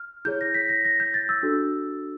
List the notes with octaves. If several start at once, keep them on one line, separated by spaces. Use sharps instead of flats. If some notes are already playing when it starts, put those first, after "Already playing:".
Already playing: F6
E4 G#4 C#5 G6
A#6
B6
A#6
A#6
G6
A6
E6
D4 F#4 A4